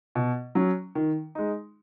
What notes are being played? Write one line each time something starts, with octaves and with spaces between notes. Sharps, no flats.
B2
F#3 C#4
D#3
G#3 D#4